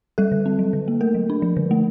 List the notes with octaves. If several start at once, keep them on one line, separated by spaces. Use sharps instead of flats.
G3 A4
D3
C4
F#3
D3
A#3
A3 A#4
F#3
D4
F3
D3
A3